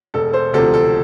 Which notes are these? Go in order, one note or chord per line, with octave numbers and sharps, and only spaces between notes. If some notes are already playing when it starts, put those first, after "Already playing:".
E1 A4
C5
D2 C3 F3 A4
A4